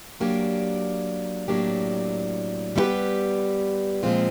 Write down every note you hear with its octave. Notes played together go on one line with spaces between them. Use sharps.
F#3 A#3 D4 G4
A2 F#3 A#3 D4 G4
G3 B3 E4 G4 B4
A#2 F3 G#3 C4 F4